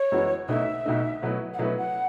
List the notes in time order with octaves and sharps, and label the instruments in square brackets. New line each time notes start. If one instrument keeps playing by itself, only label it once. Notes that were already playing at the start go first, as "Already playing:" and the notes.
Already playing: [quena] C#5
[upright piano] F#2 E3 G#3 B3 F#4
[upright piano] B1 B2 A3 D#4 [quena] E5
[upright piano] B1 B2 A3 D#4
B2 F#3 A3 E4 B4
[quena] F#5
[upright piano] B2 F#3 A3 E4 B4 [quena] E5
[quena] F#5